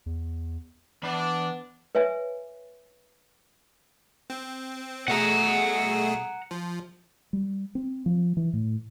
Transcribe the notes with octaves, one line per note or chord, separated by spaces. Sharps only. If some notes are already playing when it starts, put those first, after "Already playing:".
E2
E3 B3 D4 B5
B4 C#5 E5 G#5
C4
B2 A3 G#4 F#5 A#5
F3
G3
C4
F3
E3
A2